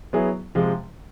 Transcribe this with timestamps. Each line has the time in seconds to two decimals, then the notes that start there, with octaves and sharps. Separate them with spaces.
0.13 F#3 B3 E4 G#4
0.55 C3 F3 G#3